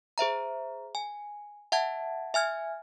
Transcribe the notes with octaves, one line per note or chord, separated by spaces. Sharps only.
G#4 C5 E5 A#5
G#5
E5 F#5 A5 G#6
E5 G#5 F6 G#6